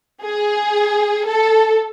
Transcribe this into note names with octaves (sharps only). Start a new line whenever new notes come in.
G#4
A4